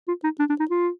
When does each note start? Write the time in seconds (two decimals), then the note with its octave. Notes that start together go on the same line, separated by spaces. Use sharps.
0.08 F4
0.24 D#4
0.39 D4
0.50 D4
0.60 D#4
0.70 F4